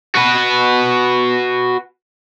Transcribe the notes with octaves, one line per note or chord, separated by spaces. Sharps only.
F#4 B4